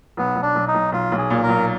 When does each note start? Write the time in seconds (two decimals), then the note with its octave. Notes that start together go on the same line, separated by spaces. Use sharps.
0.17 B1 B3
0.36 B1
0.42 D4
0.56 B1
0.68 D#4
0.75 B1
0.92 B1 F4
1.12 B1
1.18 G#4
1.30 A#2
1.43 A#4
1.49 B1